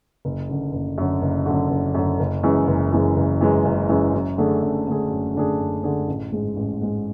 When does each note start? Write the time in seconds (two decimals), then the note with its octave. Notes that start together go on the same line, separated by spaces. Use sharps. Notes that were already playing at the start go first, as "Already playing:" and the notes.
0.25 F#1
0.49 F#2 D3
0.73 F#1
0.98 F#2 D3
1.22 F#1
1.46 F#2 D3
1.71 F#1
1.95 F#2 D3
2.20 F#1
2.43 F#2 E3 G#3
2.68 F#1
2.92 F#2 E3 G#3
3.17 F#1
3.41 F#2 E3 G#3
3.65 F#1
3.89 F#2 E3 G#3
4.14 F#2
4.38 D3 A3 D4 G#4
4.62 F#2
4.87 D3 A3 D4 G#4
5.11 F#2
5.35 D3 A3 D4 G#4
5.60 F#2
5.83 D3 A3 D4 G#4
6.08 A1
6.32 G#2 G#3
6.57 A1
6.81 G#2 G#3